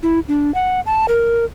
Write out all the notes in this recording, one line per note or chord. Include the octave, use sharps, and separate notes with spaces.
E4
D4
F#5
A5
A#4